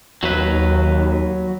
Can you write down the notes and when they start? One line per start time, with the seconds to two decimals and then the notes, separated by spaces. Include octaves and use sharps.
0.23 D#2 F#3 B4